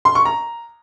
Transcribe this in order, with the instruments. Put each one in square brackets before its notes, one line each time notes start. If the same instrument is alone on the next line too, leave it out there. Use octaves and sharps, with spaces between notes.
[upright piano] C6
C#6
A#5